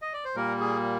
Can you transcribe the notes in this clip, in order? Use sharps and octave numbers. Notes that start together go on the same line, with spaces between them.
D#5
D5
C5
A#2 G3 A#3 A#4
G#4